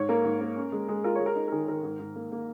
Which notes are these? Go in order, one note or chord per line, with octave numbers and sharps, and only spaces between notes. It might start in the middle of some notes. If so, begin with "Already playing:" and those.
Already playing: G#2 C#5
A#3 A#4
G#2
A#3
C#4
G#3
G#3 G#4
F4 A#4
G#3 C#5
A#4
D#4
A#4
D#3 G#4
D#3 A#4
G#2
G#2
A#3
A#3